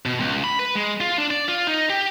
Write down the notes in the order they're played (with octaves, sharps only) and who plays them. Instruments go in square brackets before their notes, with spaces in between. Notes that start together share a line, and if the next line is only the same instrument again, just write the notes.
[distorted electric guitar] B2
C#2
B5
B4
G#3
F4
D4
D5
F4
D#4
G4